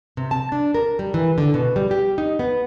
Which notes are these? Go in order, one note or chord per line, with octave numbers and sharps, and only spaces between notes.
C3
A5
D4
A#4
G3
E3
D3
B2
G3
G4
D#4
B3